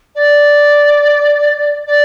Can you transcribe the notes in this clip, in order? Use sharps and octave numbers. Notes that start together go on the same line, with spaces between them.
D5
D5